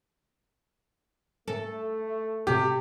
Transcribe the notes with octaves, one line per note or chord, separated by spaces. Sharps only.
A3 A4
C3 G4